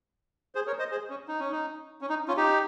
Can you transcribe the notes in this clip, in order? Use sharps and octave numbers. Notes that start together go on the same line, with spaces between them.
G#4 C5
A#4 C#5
C5 D#5
G#4 C5
C#4
D#4
C#4
D#4
C#4
D#4
C#4 F4
D#4 G4